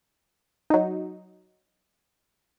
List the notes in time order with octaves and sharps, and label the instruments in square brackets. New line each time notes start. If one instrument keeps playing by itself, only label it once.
[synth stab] F#3 D#4